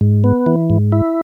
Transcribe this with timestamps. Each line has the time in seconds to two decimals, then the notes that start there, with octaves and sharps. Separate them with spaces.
0.01 G#2
0.24 B3
0.46 E3
0.70 G#2
0.92 E4